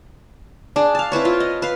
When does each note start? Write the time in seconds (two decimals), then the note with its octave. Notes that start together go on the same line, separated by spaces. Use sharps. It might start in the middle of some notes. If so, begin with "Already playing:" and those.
0.76 D4 G#4
0.95 F5 A5
1.12 C4 E4 B4 C#5
1.25 F4
1.40 D#5
1.62 B4 F5